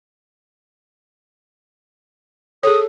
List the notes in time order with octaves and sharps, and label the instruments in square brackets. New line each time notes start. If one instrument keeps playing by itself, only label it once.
[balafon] G#4 C#5 [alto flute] A4 [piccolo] D#6